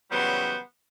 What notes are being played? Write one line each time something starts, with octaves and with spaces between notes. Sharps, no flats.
C#3 E3 F#3 G3 B3 C5